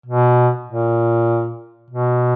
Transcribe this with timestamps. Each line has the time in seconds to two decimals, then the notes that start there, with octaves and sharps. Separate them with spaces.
0.06 B2
0.67 A#2
1.90 B2